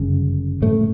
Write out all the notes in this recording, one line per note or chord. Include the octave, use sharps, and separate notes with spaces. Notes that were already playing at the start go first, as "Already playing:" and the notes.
Already playing: G1 F#2 C#3
A2 A3